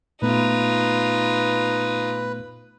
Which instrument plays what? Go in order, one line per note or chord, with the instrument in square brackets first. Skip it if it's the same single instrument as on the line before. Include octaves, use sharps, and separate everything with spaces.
[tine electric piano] A#2 A3 B3 [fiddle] D#4 F4 [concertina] B4